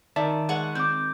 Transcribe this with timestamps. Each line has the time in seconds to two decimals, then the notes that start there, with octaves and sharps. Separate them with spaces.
0.16 D#3 D5 E5 A5
0.49 G#3 F#5 C#6
0.75 C4 D6 G6